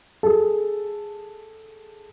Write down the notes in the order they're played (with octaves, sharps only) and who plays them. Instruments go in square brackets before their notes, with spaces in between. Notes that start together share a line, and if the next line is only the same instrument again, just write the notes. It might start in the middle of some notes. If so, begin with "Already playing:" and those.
[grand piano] G#4 A4